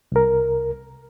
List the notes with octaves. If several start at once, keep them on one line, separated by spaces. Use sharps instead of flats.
C2 A#4